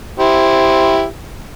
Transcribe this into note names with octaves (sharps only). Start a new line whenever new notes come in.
E4 G4 C5